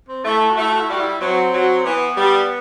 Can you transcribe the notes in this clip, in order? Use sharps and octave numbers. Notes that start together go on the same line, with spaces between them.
C4
A3 E4
E4
F#4
A3 E4
F#4
E4
G3 F#4
E4
F#3 C4
F#3
E3 B3
G3